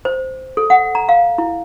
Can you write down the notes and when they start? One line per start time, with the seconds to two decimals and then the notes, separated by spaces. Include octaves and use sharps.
0.05 C5
0.57 A4
0.70 F#5
0.95 A#5
1.09 F5
1.38 E4